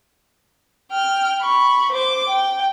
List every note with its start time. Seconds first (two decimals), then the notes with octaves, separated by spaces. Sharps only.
0.92 G5 F6
1.41 B5 C#6
1.92 C5 D6
2.29 G5